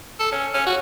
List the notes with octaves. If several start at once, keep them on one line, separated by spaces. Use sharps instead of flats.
A4
C#4
C#4
F#4